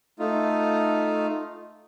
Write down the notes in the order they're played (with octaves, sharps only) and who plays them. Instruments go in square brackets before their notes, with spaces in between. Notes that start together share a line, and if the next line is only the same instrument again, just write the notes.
[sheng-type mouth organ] A3 D#4 F4